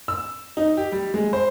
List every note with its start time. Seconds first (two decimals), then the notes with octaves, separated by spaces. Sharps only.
0.08 E6
0.57 D#4
0.77 G4
0.92 G3
1.14 G#3
1.33 C5